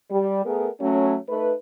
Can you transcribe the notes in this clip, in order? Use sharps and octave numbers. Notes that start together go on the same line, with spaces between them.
G3
A3 B3 G#4 A#4
F#3 A3 C#4
A3 D#4 B4